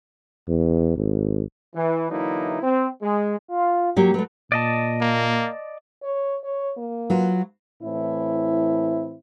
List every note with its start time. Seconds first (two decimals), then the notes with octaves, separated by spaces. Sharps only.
0.49 E2
0.97 G#1
1.75 E3
2.10 D3 E3 F#3 A#3 D#4 E4
2.63 C4
3.02 G#3
3.48 F4
3.97 F#3 A#3 G4
4.14 F#3 A3 B4
4.52 A#2 D5 D#5 A5
5.01 A#3
6.03 C#5
6.44 C#5
6.77 A#3
7.10 F#3 F4 B4
7.83 A2 E3 C4 E4